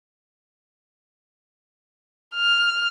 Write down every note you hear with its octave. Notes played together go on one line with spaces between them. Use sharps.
F6